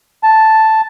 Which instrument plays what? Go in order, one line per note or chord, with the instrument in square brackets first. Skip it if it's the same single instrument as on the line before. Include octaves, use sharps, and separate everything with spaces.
[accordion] A5